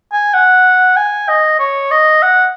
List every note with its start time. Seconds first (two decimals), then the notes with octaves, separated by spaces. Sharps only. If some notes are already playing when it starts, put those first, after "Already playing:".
0.13 G#5
0.34 F#5
0.97 G#5
1.29 D#5
1.60 C#5
1.91 D#5
2.22 F#5